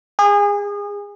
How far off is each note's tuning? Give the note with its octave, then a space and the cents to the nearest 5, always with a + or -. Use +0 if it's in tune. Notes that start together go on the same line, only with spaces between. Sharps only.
G#4 -30